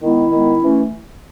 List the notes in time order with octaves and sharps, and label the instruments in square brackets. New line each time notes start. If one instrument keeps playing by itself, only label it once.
[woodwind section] D#3 G#3 B3 E4
D#3 G#3 B3
E3 A3 C#4